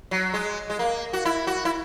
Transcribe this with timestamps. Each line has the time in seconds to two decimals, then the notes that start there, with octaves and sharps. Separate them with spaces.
0.11 F#3
0.34 G#3
0.70 G#3
0.79 A#3
1.13 F#4
1.25 E4
1.47 F#4
1.65 E4